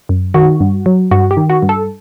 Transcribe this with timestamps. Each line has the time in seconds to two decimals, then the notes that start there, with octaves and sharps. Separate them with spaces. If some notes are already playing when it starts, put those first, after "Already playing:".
0.09 F#2
0.34 D#3 F#4
0.60 G2
0.86 F#3
1.11 G2 F#4
1.31 G4
1.37 D#3
1.50 F#4
1.62 G2
1.69 A4